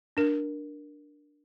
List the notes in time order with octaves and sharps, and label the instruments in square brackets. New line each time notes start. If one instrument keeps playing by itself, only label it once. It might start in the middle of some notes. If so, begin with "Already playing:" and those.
[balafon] D4 A#4